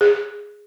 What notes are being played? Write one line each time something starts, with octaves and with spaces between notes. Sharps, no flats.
G#4